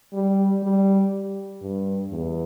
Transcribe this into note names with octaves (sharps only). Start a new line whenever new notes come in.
G3
G3
G2
E2